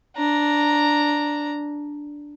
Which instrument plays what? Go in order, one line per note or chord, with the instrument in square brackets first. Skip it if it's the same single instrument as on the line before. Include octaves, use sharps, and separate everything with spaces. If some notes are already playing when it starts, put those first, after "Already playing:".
[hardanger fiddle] D4 A#5